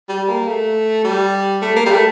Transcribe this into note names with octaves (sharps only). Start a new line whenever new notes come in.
G3
A#3
A3
G3
A3
A#3
G3
A3